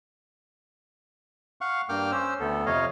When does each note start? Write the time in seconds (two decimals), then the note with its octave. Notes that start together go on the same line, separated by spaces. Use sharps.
1.61 F5 F#5 C#6
1.89 G2 A#3 G5 D6 F6
2.12 C#4 C5 E6
2.40 D2 B3 A4
2.66 F2 C3 C#5 D#5 F5